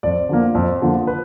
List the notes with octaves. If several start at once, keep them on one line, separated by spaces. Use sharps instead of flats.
F2 D5
D3 F3 A#3
F2
D3 F3 A#3
B4